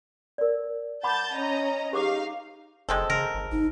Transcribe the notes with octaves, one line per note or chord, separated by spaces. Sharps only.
A#4 D5
F#5 A5 B5 D6 G6 A6
C#4 D#5 A#5
D#4 G4 G#4 F5 D6
F#1 G#3 C4 A4
C#3 A#4
G#1
G#1 D#4